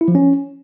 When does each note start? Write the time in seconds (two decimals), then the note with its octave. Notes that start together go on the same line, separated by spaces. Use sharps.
0.01 E4
0.08 F3
0.15 C#4